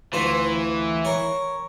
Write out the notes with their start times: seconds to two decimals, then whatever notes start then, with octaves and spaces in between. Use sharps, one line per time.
0.13 D2 E3 F4 C5
1.05 A#4 C#5